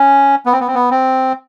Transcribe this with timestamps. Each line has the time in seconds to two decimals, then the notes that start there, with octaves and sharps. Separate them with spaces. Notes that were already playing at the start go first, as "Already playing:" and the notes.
Already playing: C#4
0.46 B3
0.52 C4
0.60 B3
0.68 C4
0.74 B3
0.91 C4